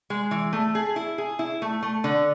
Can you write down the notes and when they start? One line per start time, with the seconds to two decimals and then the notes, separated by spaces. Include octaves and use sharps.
0.10 G#3
0.31 E3
0.53 A3
0.75 G#4
0.96 E4
1.18 G#4
1.39 E4
1.62 A3
1.83 A3
2.04 D3